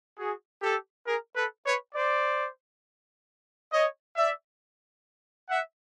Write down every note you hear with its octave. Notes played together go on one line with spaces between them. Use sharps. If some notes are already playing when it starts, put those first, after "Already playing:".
F#4 G#4
G4 A4
G#4 A#4
A4 B4
B4 C#5
C5 D5
C#5 D#5
D5 E5
E5 F#5